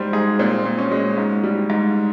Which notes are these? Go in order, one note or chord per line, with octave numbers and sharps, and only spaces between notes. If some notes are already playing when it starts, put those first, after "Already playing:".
Already playing: G#2 G3 C5
G#2 G#4
A#2 C4
A#2
C#4
G#3
G#2
G3
G#2